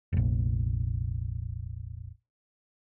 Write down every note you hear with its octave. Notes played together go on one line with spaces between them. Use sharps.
F1 A#1